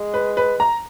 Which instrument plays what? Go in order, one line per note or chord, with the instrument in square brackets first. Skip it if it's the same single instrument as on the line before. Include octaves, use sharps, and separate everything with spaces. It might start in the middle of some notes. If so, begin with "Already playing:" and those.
Already playing: [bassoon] G#3
[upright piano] B4
B4
A#5